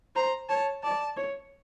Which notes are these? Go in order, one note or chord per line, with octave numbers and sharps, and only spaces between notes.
C5 A#5
C#5 A5
D5 A5
C#5